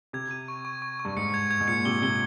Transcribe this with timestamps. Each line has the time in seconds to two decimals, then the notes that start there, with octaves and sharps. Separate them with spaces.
0.13 C3 G#6
0.31 D#7
0.48 C#6
0.65 C#6
0.82 C#6
1.00 C#6
1.05 G2
1.17 G#2 C#7
1.34 G#6
1.51 G#6
1.60 G#2
1.68 A#2 C#7
1.85 C3 G7
2.02 C3 G7